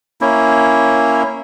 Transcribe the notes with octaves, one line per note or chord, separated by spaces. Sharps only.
A#3 C#4 E4